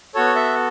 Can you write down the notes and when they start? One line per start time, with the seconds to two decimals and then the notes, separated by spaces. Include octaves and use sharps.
0.15 B3 F#4 A4 C#5
0.36 E5